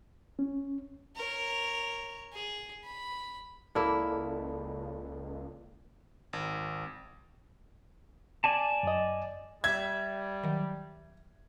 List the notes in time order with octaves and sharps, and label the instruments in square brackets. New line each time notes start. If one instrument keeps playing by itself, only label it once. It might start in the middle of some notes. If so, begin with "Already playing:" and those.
[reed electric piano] C#4
[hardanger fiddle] A#4 C#5
G#4
B5
[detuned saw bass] C#2 [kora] A#3 E4 [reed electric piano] A4 D5
[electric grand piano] G#1
[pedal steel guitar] D5 G#5 A5
[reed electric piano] F#2 D#5
[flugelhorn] G3 [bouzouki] E5 [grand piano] G#6
[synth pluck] D#3 F#3